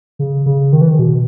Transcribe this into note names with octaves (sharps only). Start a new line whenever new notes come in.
C#3
C#3
D#3
E3
D#3
B2